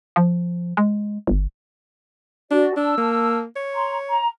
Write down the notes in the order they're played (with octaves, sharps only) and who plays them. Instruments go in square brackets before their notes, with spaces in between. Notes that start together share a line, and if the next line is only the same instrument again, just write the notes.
[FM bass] F3
G#3
G1
[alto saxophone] D4 [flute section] F#4 D5
[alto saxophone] D4 [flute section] A5 E6
[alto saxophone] A#3
C#5
[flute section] A#5 C6
A#5